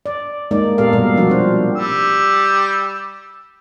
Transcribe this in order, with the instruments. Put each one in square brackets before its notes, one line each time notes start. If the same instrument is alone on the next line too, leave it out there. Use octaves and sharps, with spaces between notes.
[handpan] D5
G#3 A#3 D#4 D5
A#2 B3 G4 A4 A#4 F5
B2 G3 A#3 A#4 D5
F3 D4 F#4
C4 C5
[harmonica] G3 E6